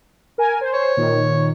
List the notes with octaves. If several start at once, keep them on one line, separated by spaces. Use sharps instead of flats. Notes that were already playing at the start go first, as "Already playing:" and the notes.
A#4 G#5
C5
C#5
A#2 D#3